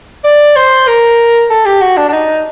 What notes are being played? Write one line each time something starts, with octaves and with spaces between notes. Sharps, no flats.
D5
C5
A#4
A4
G4
F#4
D4
D4
D#4